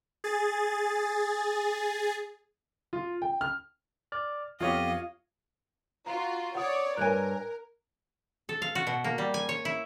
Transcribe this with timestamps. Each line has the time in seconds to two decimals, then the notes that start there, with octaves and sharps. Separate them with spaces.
0.24 G#4 A6
2.93 F4
3.22 G5
3.41 F6
4.12 D5 F6
4.61 F2 B3 F4 G4 C#5 D#5 F5
6.06 F4 F#4 A#5
6.55 C#5 D5 F#5 D#6
6.97 G2 A#4 C#5 G#5 F#6 G#6 D7
8.49 A4
8.62 F5
8.75 F#4
8.87 B2
9.04 A#3
9.18 G3
9.34 G#5
9.49 C#5
9.65 E4